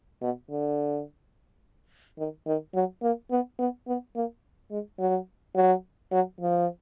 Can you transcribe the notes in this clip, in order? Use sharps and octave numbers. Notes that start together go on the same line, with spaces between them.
B2
D3
D#3
D#3
F#3
A#3
B3
B3
B3
A#3
G#3
F#3
F#3
F#3
F3